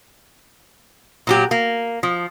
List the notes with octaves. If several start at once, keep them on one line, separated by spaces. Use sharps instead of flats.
A#2 F#3 G4
A#3
F3